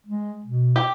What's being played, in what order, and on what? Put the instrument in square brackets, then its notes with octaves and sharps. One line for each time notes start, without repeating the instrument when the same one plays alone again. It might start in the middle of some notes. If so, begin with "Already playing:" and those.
[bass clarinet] G#3
B2
[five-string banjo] G4